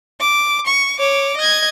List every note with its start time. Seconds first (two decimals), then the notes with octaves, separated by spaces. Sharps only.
0.20 D6
0.67 C#6
0.99 C#5 D6
1.37 D#5 G#6